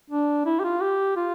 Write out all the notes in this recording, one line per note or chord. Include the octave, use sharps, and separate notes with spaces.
D4
E4
G4
F4
G4
F4